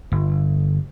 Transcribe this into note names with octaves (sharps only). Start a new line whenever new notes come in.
G1